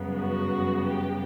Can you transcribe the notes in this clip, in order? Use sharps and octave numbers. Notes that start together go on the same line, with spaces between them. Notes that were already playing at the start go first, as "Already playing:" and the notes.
Already playing: F#2 C#3 G3 B3
F#4
G4